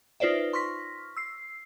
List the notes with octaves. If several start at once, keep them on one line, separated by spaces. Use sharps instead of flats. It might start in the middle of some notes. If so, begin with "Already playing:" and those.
D#4 F4 B4 C5 D5 E5
C6 C#6 F6 A#6 B6
E6 C7